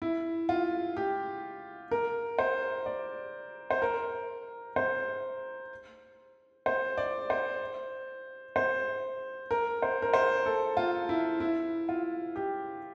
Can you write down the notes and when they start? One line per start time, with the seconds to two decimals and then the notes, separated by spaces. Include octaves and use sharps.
0.02 E4
0.49 F4
0.97 G4
1.91 A#4
2.39 C5
2.86 D5
3.70 C5
3.82 A#4
4.76 C5
6.66 C5
6.97 D5
7.30 C5
8.56 C5
9.51 A#4
9.82 C5
10.02 A#4
10.14 C5
10.46 A4
10.77 F4
11.09 E4
11.40 E4
11.89 F4
12.36 G4